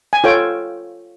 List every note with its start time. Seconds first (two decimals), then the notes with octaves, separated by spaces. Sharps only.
0.13 G#5
0.24 F4 A4 C#5 G5